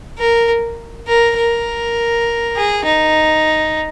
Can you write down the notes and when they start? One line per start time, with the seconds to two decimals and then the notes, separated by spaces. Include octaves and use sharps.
0.18 A#4
1.07 A#4
1.37 A#4
2.56 G#4
2.85 D#4